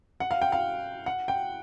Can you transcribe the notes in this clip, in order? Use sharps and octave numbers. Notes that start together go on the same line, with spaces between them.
F#5
F5
G5
F5
F#5
G5